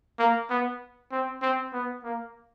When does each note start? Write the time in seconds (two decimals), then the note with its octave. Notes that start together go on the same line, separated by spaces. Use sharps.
0.19 A#3
0.50 B3
1.12 C4
1.42 C4
1.73 B3
2.04 A#3